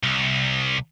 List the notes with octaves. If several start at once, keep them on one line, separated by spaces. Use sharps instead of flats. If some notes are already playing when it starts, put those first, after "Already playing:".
C2